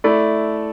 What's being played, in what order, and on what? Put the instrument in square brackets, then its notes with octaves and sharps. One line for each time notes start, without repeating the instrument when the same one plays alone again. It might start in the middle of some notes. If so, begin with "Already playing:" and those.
[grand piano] A3 E4 A4 D5